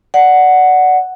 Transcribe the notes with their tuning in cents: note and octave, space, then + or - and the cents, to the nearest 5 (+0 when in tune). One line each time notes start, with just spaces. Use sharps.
D5 +0 F#5 +0